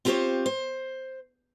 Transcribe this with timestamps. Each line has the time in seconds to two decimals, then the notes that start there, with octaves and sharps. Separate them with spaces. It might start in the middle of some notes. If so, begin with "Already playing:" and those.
0.05 C4 F4 G4 A4 C5 C#5
0.46 C5